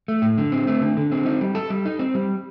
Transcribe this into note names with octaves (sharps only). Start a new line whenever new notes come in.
A3
A2
D3
C4
A3
D3
D3
C4
D#4
G3
A4
G3
D#4
C4
G3